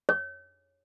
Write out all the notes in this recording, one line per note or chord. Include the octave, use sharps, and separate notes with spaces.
C#5